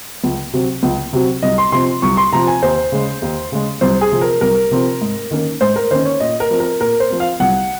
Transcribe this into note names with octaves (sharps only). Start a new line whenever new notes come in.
C#2
C3 F#3 C4
C#2
C3 F#3 C4
C2 D#5
C6
C3 F3 C4 C6
C2 C#6
C6
C3 F3 C4 A#5
G#5
D#2 C5
C#3 G#3
D#2
C#3 G#3
C2 C5
G#4
C3 F3 C4
A#4
C2 A#4
C3 F3 C4
G#2
D#3 A#3 C#4
G#2 C5
A#4
D#3 A#3 C#4 C5
C#5
A#2 D#5
A#4
F3 C4
A#4
A#2 A#4
C5
F3 C4
F5
C2 F#5